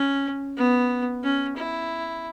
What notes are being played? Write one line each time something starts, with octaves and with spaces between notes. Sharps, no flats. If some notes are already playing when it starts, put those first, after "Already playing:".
Already playing: C#4
B3
C#4
E4